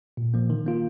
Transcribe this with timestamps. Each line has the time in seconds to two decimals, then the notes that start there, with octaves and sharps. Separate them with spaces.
0.17 A#2
0.34 F3 A#3
0.50 D#3
0.66 A#3 F4